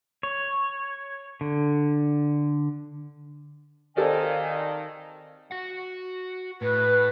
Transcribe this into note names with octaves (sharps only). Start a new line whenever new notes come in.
C#5
D3
D#3 C4 A4 D5 F5 G#5
F#4 F#5
A2 B4